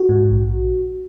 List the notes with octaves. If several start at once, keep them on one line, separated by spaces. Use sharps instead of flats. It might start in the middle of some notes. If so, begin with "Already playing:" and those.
Already playing: F#4
G#2
A#1